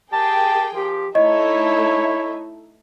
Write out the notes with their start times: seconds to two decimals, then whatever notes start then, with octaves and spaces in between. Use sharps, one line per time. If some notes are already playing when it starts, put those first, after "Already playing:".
0.13 G4 G#4 A#4 G5 A5
0.75 F3 G4
1.15 A3 D#4 E4 C#5 D#5 E5